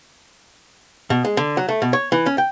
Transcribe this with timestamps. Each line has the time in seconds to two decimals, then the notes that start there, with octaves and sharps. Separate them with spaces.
1.10 B2
1.25 G#3
1.37 D3
1.57 F#3
1.69 A3
1.82 B2
1.93 C#5
2.12 E3
2.26 C#4
2.38 G5